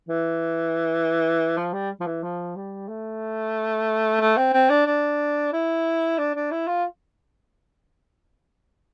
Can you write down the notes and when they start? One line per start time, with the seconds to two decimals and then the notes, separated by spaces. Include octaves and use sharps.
0.08 E3
1.57 F3
1.73 G3
2.00 F3
2.06 E3
2.23 F3
2.56 G3
2.88 A3
4.20 A3
4.37 C4
4.53 C4
4.70 D4
4.86 D4
5.53 E4
6.18 D4
6.35 D4
6.51 E4
6.67 F4